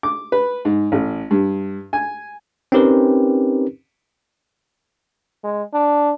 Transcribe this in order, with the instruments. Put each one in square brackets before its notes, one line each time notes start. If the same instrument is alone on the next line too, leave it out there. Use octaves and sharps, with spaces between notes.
[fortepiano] D6
B4
G#2
A1
G2
G#5
[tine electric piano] C4 C#4 D#4 G4 A#4 B4
[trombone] G#3
D4